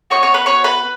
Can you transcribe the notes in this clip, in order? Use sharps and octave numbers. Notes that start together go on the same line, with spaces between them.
B3 D#4 F#4 C#5 C#6
C#5 C#6
B4 B5
C#5 C#6
B4 B5